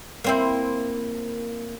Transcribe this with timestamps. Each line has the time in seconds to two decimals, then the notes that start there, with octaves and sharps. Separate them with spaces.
0.24 A#3 C4 E4